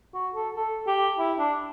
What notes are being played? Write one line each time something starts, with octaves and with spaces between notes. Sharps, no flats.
F#4
A4
A4
G4
E4
D4